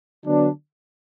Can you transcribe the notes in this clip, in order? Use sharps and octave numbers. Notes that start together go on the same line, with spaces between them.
D3 F#3 B3 D4